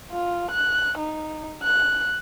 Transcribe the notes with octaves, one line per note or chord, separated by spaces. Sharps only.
F4
F#6
D#4
F#6